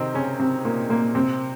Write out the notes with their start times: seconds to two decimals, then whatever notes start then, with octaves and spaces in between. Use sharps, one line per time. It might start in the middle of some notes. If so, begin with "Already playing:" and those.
Already playing: C3 D#3 C4 D#4
0.14 C#3 C#4
0.39 C3 C4
0.65 A#2 A#3
0.90 A#2 A#3
1.15 C3 C4